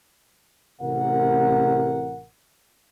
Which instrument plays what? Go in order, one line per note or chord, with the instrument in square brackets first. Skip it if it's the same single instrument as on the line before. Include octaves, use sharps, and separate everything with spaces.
[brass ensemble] A1 C3 A#4 F#5